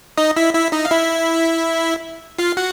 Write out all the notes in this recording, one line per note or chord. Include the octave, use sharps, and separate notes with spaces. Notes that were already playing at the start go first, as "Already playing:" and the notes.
D#4 D#5
E4 E5
E4 E5
D#4 D#5
F5
E4 E5
F4 F5
F#4 F#5